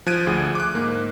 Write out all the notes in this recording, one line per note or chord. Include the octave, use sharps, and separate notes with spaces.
F3 F#6 G#6 D7 D#7
D2 G#4
D6 F#6
G#2 A#3